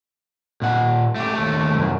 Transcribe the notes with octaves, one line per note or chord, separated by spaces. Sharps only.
A#2 F#5
A3 G4
D#2 A3
C2 F#2